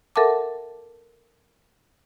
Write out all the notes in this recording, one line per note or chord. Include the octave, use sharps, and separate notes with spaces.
A4 A#4 E5 F#5 A5 D6